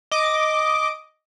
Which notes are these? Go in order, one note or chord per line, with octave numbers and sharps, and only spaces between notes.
D#5 D6